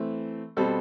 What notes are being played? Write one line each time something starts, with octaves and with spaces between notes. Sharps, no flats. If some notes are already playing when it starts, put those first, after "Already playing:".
Already playing: E3 A3 C4
B2 G3 C4 A4